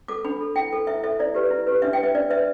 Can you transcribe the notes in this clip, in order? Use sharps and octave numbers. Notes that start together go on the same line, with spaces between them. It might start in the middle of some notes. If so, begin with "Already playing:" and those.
A4 D6
D4 B5
A4
E4 G5
A4
E4 E5
A4 E5
E4 D5
G4 B4
E4
G4 B4
D4 E5
B4 G5
E5
D4 D5
B4 E5